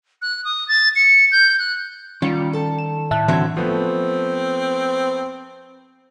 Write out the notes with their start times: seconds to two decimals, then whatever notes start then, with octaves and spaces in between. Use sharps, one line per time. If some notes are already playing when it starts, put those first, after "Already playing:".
0.22 F#6
0.44 D#6
0.68 A6
0.96 C#7
1.32 G6
1.59 F#6
2.22 D#3 G3 C#4 F4 C#7
2.53 A4 A5
2.79 E7
3.11 A2 E5 A5 F#6
3.28 D3 E3 F#3 C4 E5 G#6
3.57 F3 A3 B3 C4